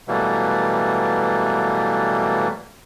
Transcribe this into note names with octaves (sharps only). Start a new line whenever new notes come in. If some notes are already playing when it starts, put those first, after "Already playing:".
B2 E3 F#3 G3 A3 A#3